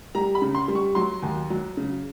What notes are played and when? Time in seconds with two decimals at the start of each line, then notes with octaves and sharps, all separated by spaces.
0.15 G3 A#5
0.35 B5
0.42 C#3
0.55 C6
0.68 G3
0.75 C#6
0.95 F#3 C6
1.22 D#2
1.50 F#3
1.77 C#3